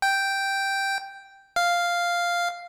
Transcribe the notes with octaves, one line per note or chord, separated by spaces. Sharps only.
G5
F5